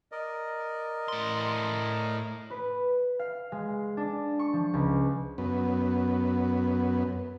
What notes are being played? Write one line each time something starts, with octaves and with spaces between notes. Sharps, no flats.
A#4 D5 D#5
A2 C6
B4
F5
G#3
D4
C#6
F3
C#2
F#2 B3